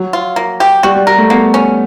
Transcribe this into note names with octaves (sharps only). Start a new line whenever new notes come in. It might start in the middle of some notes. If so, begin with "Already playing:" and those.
Already playing: F#3
F4
A#3
G4
G3 F#4
G3
G3 A#4
A3
A#3 B3
C#4